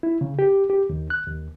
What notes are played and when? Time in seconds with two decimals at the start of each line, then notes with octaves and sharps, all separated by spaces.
0.03 E4
0.21 C#3
0.39 G4
0.70 G4
0.90 D#2
1.10 F#6
1.27 D#2